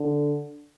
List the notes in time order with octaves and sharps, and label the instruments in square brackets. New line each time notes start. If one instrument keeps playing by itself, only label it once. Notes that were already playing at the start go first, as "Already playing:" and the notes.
Already playing: [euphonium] D3